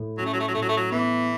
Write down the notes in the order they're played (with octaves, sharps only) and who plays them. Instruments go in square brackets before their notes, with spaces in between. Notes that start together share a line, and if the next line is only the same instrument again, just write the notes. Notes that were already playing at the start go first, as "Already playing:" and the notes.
Already playing: [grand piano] A2
[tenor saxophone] F#3 [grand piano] C#4
[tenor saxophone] A3
F#3
A3
F#3
[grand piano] A2 [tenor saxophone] A3
[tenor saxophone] F#3
A3
F#3
[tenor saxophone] E3 [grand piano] B3